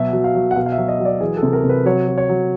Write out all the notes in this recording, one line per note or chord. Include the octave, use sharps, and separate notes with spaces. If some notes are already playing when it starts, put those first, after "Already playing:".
Already playing: B2 F#3 E5
F#3
F5
F#3
F#5
B2 F5
F5
E5
F#3
D#5
F#3
D5
E3 G#4
A4
C3
A#4
C3
B4
F#3 C#5
F#3
C#5
F#3